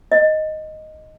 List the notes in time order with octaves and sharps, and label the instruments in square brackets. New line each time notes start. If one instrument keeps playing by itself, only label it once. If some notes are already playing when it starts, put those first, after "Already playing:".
[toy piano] D#5